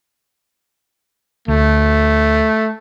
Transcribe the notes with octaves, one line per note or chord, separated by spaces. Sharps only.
D2 A3